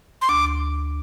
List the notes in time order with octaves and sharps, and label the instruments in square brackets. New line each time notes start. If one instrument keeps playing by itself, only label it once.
[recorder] C6
[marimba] D2 [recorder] D6